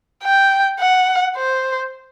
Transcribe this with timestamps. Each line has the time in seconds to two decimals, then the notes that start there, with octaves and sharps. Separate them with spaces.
0.23 G5
0.80 F#5
1.36 C5